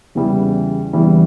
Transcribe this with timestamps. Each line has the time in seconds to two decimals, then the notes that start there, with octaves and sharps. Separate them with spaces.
0.15 E2 C#3 E3 G3
0.93 E2 C#3 E3 G3